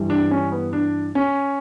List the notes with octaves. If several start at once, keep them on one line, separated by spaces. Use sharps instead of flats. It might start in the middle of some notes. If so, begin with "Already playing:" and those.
Already playing: G2 E3 G3
D4
C#4
B3
D4
C#4